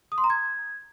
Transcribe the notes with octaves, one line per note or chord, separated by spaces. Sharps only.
D#6
C6
A#5
G#6